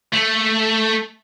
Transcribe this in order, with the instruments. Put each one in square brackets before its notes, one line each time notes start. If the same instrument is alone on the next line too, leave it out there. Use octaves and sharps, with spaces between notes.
[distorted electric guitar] A3